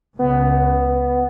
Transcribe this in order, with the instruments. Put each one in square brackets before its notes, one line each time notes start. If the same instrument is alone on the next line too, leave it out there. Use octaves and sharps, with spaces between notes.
[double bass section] C#2 [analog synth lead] B3